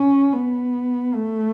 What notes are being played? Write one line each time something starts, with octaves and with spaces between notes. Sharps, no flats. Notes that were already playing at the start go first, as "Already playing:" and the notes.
Already playing: C#4
B3
A3